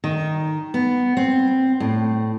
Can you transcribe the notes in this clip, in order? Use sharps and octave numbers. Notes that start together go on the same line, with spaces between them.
D#3
B3
C4
A2